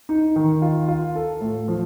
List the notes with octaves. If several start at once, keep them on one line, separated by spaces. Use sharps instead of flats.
D#4
D#3
F4
F4
A4
A2
F3